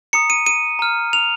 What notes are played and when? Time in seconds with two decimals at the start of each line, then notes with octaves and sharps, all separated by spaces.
0.13 A#5 D#6 C#7
0.30 D#7
0.46 D#7
0.79 A#5 F6
1.13 F7